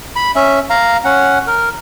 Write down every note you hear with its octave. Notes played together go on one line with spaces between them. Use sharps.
B5
C#4 E5
F5 A#5
C#4 F#5
A#4